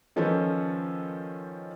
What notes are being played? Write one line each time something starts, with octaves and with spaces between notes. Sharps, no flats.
D#3 F3 C#4 A4 B4 C5